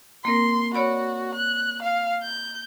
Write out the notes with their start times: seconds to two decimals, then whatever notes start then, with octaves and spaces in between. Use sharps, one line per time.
0.25 A#3 C4 A#4 C6
0.74 F#4 C#5 D5 B5
1.35 F#6
1.83 F5
2.23 G6